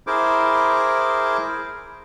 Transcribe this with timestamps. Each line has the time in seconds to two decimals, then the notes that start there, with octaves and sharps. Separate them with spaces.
0.07 E4 G#4 A#4 C5 D6